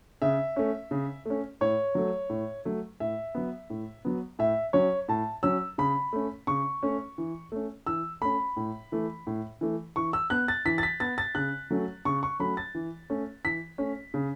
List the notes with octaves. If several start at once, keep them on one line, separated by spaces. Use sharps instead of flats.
C#3 E5
A3 C#4
C#3
A3 C#4
A2 C#5
F#3 A3
A2
F#3 A3
A2 E5
F#3 B3
A2
F#3 B3
A2 E5
F#3 C#4 C#5
A2 A5
F#3 C#4 E6
C#3 B5
A3 C#4
C#3 C#6
A3 C#4
E3
A3 C#4
E3 E6
A3 C#4 B5
A2
E3 A3
A2
E3 A3
E3 C#6
E6
B3 F#6
A6
E3 B6
A6
B6
B3 A6
A6
C#3 F#6
F#3 A3 C#4
C#3 C#6
C#6
F#3 A3 C#4 B5
A6
E3
A3 C#4
E3 B6
A3 C#4
C#3